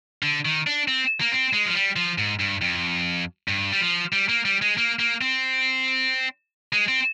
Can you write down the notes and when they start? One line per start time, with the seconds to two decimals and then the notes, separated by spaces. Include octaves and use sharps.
0.23 D3
0.45 D#3
0.67 D4
0.88 C4
1.21 A#3
1.32 C4
1.53 G#3
1.66 F3
1.75 G3
1.96 F3
2.18 G#2
2.40 G2
2.61 F2
3.48 G2
3.72 G3
3.81 F3
4.13 G3
4.29 A#3
4.45 G3
4.62 G#3
4.78 A#3
4.99 A#3
5.21 C4
6.73 G#3
6.88 C4